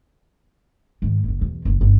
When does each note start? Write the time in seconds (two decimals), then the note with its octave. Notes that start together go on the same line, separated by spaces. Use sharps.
1.02 G#2 D#3
1.24 F#1 E2
1.41 B1 E2
1.65 F#1 G2
1.81 G1 C#4